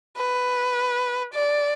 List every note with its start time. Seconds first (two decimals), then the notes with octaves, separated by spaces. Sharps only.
0.17 B4
1.34 D5